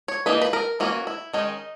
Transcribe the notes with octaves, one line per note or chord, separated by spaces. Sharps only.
C#5
E3 A#3 D#4 B4
B4
A#4
E3 A#3 C#4 F#4
E4
D#3 G#3 C#4 D#4